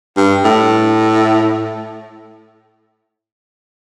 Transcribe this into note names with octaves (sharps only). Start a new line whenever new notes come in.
G2
A2